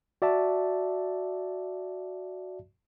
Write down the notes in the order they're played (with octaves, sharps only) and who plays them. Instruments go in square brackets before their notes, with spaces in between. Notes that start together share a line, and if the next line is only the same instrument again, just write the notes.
[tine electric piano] F#4 D5 E5 A5